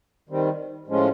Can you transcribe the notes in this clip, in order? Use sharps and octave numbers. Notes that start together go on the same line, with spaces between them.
D#3 G3 C4
A2 F3 G#3 C#4 F4